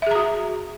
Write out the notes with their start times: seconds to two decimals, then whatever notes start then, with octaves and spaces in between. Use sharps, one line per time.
0.02 E5
0.07 G#4
0.11 A#5
0.15 F#4